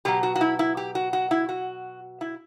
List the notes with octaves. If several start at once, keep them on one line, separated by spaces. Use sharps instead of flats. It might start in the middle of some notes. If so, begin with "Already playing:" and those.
B2 F#3 G4
F#4
F#4
E4
E4
G4
F#4
F#4
E4
F#4
E4